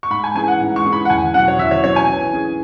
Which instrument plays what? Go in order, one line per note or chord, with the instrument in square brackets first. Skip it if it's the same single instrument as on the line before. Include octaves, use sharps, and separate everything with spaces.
[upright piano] C#6
[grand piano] G#2 [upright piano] B5
[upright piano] G#5
[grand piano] E3 C#4 G#4 [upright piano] G#5
[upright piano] F#5
[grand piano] G#2
[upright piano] C#6
[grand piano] E3 C#4 G#4
[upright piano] B5
F#5
[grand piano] E2 [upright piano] G#5
[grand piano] B2 F#3 C#4 [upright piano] F#5
[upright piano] C#5
[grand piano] E2 [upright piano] E5
[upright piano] C#5
[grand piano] B2 F#3 C#4 [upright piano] C#5
[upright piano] G#5
[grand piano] E3
C#4 G#4